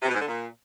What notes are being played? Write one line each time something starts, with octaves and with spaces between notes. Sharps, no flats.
C3
B2
G#2
D3
A#2